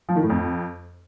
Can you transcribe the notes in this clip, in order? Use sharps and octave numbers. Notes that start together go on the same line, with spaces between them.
F3
D#3
A2
F2